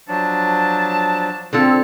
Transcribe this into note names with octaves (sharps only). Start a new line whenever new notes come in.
F3 F#3 D4 A5
D3 C4 F4 A4